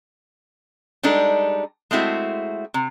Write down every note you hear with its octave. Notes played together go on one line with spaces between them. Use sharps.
G3 G#3 D4 D#4 A4
G#3 A3 C4 E4 F#4
C3